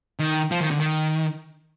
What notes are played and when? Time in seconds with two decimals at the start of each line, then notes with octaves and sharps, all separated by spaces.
0.19 D#3
0.51 F3
0.61 D#3
0.71 D3
0.80 D#3